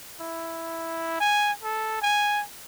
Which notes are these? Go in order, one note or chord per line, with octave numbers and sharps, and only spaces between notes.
E4
G#5
A4
G#5